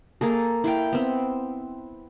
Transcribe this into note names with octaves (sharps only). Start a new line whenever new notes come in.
A#3 G#4 A4
E4 F5 G5
B3 C4